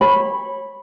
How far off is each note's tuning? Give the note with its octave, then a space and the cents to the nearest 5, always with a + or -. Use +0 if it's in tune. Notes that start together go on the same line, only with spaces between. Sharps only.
C#5 -25 B5 -5